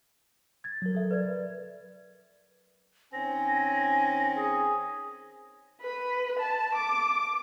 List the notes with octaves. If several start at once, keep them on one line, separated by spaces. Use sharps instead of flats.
G#6 A6
F#3 A#4
A4 E5
B4 D5 G#6
D#3 C4 C#4 G#5 A#6
G#4
B4
A5
D6